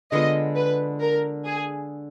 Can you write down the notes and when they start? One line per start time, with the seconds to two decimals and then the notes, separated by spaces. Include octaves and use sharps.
0.12 D3 G#3 B3 F4 D#5
0.56 B4
1.00 A#4
1.45 G#4